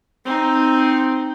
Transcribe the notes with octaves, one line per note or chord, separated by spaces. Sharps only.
C4 D#4